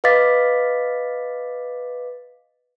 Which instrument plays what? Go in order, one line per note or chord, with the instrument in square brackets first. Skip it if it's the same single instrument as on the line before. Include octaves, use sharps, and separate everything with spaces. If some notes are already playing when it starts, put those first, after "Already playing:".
[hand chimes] B4 D#5 F5 D6 A6 B6